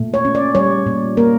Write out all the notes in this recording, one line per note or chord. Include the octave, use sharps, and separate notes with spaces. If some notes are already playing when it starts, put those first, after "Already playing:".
Already playing: A#2 A3
C#5
C#4
D5
G3 C#5
A#2
A#3 A#4